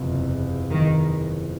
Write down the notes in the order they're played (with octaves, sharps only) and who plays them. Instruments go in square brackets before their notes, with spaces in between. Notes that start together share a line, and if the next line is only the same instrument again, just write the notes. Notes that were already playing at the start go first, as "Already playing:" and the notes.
Already playing: [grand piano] F#1 E2 C3 F3
[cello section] D#3